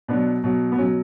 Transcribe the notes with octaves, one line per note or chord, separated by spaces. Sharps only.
B2 F#3 B3 D4
B2 F#3
B3
B2 F#3 C#4